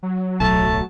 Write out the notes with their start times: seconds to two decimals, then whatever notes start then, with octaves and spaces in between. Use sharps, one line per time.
0.03 F#3
0.40 D1 B1 A3 A5